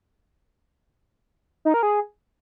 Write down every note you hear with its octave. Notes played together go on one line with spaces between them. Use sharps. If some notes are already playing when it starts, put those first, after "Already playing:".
D#4
A#4
G#4